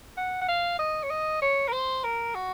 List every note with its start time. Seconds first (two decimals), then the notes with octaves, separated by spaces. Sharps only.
0.17 F#5
0.41 F#5
0.48 F5
0.79 D#5
1.04 C#5
1.10 D#5
1.42 C#5
1.68 A#4
1.73 C5
2.04 A#4
2.35 F#4